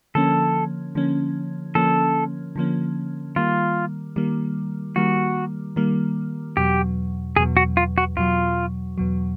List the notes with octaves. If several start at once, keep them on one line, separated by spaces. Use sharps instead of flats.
D3 F3 A#3 C#4 A4
D3 F3 A#3 C#4
D3 F3 A#3 C#4 A4
D3 F3 A#3 C#4
D#3 G3 A#3 F4
D#3 G3 A#3
D#3 G3 A#3 F#4
D#3 G3 A#3
E2 B2 F#3 G4
E2 B2 F#3 G#4
F#4
F4
F#4
E2 B2 F#3 F4
E2 B2 F#3